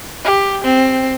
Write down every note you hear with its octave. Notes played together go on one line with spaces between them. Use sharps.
G4
C4